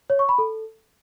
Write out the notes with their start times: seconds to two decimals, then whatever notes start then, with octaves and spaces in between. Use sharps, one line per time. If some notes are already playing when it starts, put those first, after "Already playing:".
0.10 C#5
0.19 C#6
0.29 B5
0.38 A4